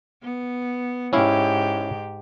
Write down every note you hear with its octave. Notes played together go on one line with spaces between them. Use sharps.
B3
G#2 C#4 E4 G4 F5